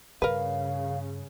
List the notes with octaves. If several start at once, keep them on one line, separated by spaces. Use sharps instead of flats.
G2 C#3 A#4 B4 F5